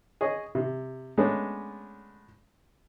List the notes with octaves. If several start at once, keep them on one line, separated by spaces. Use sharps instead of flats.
G#4 C#5 D#5
C3
G#3 A3 B3 C#4 D4 A4